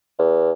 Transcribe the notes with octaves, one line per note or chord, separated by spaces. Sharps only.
E2